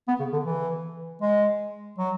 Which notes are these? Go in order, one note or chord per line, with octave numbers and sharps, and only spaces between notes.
B3
C#3
D3
E3
G#3
F#3